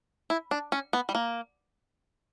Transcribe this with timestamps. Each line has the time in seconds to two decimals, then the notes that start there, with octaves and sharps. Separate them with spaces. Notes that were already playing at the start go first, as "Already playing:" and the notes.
0.30 E4
0.51 D4
0.72 C#4
0.93 B3
1.09 G3
1.15 A#3